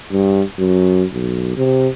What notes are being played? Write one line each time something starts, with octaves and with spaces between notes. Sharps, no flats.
G2
F#2
B1
C3